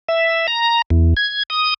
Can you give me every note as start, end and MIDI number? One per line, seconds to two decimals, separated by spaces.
0.08 0.47 76
0.48 0.82 82
0.90 1.14 40
1.17 1.43 92
1.50 1.74 87